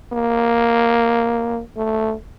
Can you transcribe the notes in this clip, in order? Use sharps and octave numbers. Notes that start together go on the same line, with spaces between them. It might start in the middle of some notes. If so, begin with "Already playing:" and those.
A#3
A3